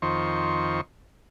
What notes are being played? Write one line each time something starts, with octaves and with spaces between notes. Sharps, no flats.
F2 D#3 C5 C#6